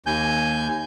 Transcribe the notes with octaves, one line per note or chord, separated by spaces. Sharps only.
D#2 G#5 G6